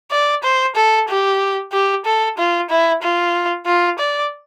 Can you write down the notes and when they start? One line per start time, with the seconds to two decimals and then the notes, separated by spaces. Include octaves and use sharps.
0.11 D5
0.43 C5
0.76 A4
1.09 G4
1.72 G4
2.06 A4
2.38 F4
2.70 E4
3.02 F4
3.66 F4
3.99 D5